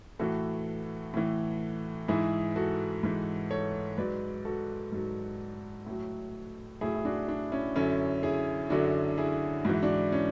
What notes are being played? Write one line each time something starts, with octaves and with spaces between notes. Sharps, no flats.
A2 E3 F#4 A4
A2 E3
G#2 E3 E4 G#4
F#4 A4
G#2 E3
A4 C#5
G#2 F#3 B4 D5
F#4 A4
G#2 F#3
A2 F#3
A2 F#3 E4 G#4
E4
D4 F#4
D4
C#4 E4
F#2 D3 F#3 C#4 E4
E4 G#4
F#2 D3 F#3 D4 F#4
E4 G#4
G#2 E3 E4 F#4
D4 F#4
C#4 E4